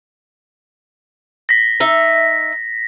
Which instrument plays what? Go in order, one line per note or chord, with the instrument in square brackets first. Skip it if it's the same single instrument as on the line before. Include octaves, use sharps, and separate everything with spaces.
[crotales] A#6 B6
[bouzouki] D#4 E5